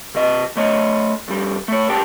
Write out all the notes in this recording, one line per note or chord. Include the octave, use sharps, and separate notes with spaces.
C3 D#5
A3 C#5 D#5
F2 G3
A3 C#5
C2 A#2 G4 G5 A5